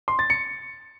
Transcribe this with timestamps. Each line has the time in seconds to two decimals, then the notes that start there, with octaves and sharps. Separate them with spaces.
0.08 C6
0.19 A6
0.30 C#7